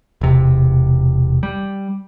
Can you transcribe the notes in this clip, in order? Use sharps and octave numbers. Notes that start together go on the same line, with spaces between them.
E1 C3
G3